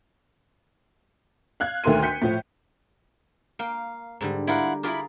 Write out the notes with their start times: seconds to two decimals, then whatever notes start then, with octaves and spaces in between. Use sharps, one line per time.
1.60 F5 F#6 G#6
1.84 D2 D#3 A3 A#4 C6 D#7
2.03 G6 B6 C#7
2.22 A2 F3
3.59 A#3 F5 G5
4.21 G#2 D3 G3
4.47 E4 F4 G4 A#4 F#5
4.83 E4 F4 G#4 A#4 B5 D6